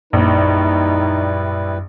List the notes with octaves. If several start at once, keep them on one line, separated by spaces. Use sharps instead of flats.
A#1 F#2 G3 D#4 E4 B4